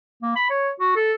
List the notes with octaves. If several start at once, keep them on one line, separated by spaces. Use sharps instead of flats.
A#3
B5
C#5
F#4
A4